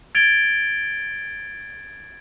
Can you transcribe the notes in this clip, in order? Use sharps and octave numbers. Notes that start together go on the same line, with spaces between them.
G#6 A6 D7 F7 G7